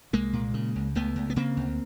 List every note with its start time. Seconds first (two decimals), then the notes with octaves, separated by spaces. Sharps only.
0.13 C2 G#3 A#3
0.33 A#2
0.54 C#3
0.76 C#2
0.95 C#2 A3 B3
1.16 C#2
1.30 B3
1.36 C#3 A#3 C4
1.57 D2